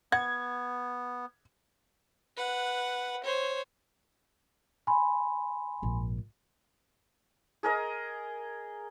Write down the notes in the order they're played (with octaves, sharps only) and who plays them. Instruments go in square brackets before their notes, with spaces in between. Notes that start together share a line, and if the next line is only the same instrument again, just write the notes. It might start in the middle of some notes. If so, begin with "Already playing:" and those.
[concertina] B3 [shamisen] F#5 [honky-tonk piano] G#6
[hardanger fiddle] B4 F#5
C5 C#5
[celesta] G#5 B5 C6
[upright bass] A#1 G#2
[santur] G#4 A#4 D#5